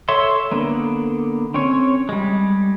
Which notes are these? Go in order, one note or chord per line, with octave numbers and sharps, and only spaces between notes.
A4 C#5 E5 C6
D3 A#3 B3
C4 C#4 C#5
G3 G#3